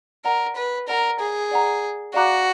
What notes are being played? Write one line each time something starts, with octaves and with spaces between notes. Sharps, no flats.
A#4 D5 F#5 A#5
B4
A#4 D5 F#5 A#5
G#4
D5 F#5 A#5
F#4 D5 F5 A#5 D6 F#6